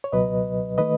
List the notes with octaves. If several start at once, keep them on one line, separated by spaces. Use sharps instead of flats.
C#5
C#2 B2 F#3 B4 D#5
D#3 A3 B4 D#5